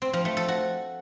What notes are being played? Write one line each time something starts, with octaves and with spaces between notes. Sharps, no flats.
C4
F3
A3
A4
F#4